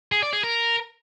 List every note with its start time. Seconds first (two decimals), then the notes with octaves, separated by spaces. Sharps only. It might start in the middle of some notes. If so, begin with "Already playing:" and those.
0.12 G#4
0.23 D5
0.33 G#4
0.43 A#4